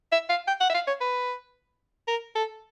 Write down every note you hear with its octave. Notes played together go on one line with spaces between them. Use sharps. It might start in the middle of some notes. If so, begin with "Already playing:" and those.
E5
F5
G5
F#5
E5
F5
C#5
B4
A#4
A4